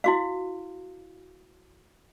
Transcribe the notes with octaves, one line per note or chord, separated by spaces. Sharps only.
E4 F#4 F5